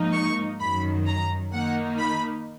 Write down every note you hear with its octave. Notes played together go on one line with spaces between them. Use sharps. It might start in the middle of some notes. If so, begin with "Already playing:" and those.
Already playing: G#2 F3 A#3 D#4
C#6
F#2 D#3 F#3 B5
A#5
D#3 A#3 D#4 F#5
B5